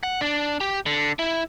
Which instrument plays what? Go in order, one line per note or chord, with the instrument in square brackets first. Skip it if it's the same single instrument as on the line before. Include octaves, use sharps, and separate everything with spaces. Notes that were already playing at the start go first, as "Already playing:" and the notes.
[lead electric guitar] F#5
D4
G4
D3
E4